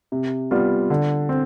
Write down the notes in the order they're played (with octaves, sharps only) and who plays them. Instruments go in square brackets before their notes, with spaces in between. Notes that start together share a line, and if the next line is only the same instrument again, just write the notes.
[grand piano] C3
G3 B3 F4
D3
C4